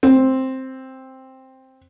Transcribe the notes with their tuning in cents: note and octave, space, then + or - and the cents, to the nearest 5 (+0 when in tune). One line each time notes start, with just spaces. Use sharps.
C4 +5